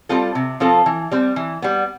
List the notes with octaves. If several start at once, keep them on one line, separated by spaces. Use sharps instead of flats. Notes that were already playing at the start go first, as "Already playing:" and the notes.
G3 C4 F4 A4
C3
F3 C4 F4 A4
E3
G3 C4
E3
G3 B3